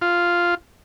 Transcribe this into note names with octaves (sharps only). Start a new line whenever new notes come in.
F4